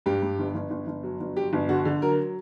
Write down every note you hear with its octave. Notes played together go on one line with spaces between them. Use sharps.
G2 G4
G2
G1
G1
G1
G1
F#3
G1
F#3 G4
G1
D3 F#4
D3
F#3 A#4